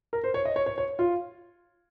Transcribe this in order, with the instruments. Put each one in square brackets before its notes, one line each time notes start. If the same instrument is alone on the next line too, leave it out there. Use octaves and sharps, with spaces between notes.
[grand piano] A#4
C5
C#5
D#5
C#5
C#5
C#5
F4